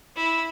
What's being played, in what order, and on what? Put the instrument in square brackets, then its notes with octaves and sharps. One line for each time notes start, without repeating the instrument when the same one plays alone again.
[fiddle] E4